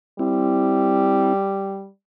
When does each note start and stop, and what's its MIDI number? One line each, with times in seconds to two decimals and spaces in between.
0.19 1.88 55
0.19 1.34 60
0.19 1.34 64